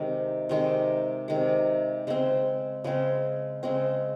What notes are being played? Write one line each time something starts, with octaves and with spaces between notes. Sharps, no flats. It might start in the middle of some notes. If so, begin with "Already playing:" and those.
Already playing: C3 D#3 G#3
C3 D#3 G#3
C3 D#3 G#3
C#3 G#3 C4
C#3 G#3 C4
C#3 G#3 C4